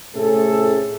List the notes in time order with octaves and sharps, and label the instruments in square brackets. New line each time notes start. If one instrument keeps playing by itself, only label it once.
[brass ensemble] A2 C3 A3 C#4 G#4 A4